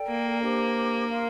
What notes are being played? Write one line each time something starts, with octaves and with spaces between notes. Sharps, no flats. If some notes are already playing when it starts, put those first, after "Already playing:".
Already playing: A4 D5 G5
A#3
D4 G4 C5
A#4 F5 C6